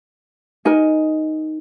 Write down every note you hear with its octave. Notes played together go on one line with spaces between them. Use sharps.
D#4 A#4 D#5 G#5